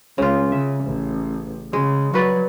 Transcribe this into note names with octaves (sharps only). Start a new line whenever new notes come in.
C#2 C#3 F4
C#3 E5
A1
C#3 G#3
F#3 F#4 B4 D5